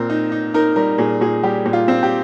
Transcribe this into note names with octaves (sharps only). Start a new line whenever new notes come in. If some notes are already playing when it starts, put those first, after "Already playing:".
Already playing: A#2 C4 A#4
D#4
D#4
D#4 A#4
G3 A#4
A#2 G#4
A#2 G#4
G3 G4
A#2
F4
C4
G4